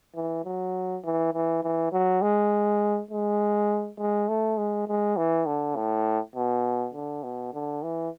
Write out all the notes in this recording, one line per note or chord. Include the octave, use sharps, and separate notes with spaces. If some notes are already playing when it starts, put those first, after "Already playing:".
E3
F#3
E3
E3
E3
F#3
G#3
G#3
G#3
A3
G#3
G#3
E3
D3
A2
B2
D3
B2
D3
E3